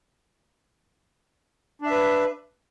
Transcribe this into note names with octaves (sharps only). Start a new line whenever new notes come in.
D4 B4 E5